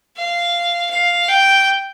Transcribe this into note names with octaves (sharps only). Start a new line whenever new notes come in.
F5
F5
G5